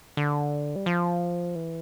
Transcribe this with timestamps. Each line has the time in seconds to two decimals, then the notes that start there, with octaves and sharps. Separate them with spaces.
0.17 D3
0.76 G3
0.86 F3
1.55 E3